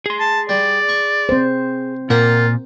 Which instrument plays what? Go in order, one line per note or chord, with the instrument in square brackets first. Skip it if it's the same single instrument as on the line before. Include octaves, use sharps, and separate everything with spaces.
[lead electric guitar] G#4 C6
[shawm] A5
[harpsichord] G3 [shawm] D5
[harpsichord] C#6
[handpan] C4 C5
[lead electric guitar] A#2 [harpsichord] A#3 F#5 G5 [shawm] F4